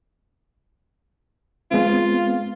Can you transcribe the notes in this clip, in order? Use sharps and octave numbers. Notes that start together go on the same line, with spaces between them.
G#3 B3 C4 F4